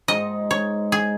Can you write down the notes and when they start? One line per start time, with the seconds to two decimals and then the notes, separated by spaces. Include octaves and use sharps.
0.08 G#2 G#3 D#4 D#5
0.51 C#5
0.92 G#4